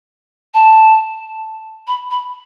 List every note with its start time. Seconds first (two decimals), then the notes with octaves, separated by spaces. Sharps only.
0.54 A5
1.87 B5
2.10 B5